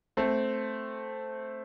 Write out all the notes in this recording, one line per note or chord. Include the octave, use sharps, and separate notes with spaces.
A3 C4